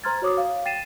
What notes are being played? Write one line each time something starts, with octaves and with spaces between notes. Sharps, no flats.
C5 A#5 C6 F6 G#6 A6
F#4 C#5 D6 D#6
F5
G5 A6 C7 D#7 E7